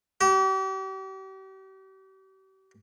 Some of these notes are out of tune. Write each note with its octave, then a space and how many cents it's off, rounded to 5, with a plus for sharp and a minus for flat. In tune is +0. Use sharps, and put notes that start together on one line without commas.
G4 -40